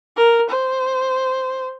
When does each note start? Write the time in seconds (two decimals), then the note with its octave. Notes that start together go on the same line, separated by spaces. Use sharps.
0.17 A#4
0.50 C5